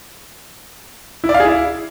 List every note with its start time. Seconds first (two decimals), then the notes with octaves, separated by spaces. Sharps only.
1.24 E4
1.29 D5
1.34 F5
1.40 G#4
1.45 E4